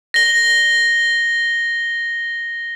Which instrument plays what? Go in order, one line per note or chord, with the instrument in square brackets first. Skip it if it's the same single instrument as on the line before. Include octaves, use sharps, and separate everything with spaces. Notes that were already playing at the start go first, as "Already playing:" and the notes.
[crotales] A#6 G7